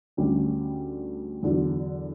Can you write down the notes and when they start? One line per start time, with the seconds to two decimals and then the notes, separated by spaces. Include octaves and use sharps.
0.17 D2 D3 G3 C#4 G4
1.43 E2 D3 F#3